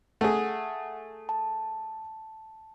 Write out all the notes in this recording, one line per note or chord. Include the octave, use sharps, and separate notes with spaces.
A3 G#4 F#5
A5